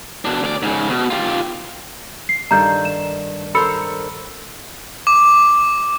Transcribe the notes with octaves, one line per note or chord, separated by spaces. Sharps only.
B2 D4
D2 D5
G#2 C#3
B2
F4 G4
C7
G2 D#3 A4 A#5 G6
E7
A4 A#4 C5 B5 E6 C#7
D6